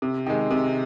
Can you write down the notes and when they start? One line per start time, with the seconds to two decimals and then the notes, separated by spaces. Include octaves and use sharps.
0.02 C3
0.26 D#3 G#3
0.51 C3